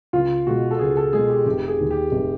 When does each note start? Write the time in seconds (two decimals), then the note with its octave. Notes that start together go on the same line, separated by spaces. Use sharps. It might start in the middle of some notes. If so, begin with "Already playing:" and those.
0.13 C#2 F4
0.47 B2 G#3 F#4
0.71 A4
0.79 C#2 G#4
0.97 A4
1.13 B2 G#3 G#4
1.29 G4
1.45 F1 G4
1.68 G#4
1.79 D#2 D#3
1.91 G4
2.12 F1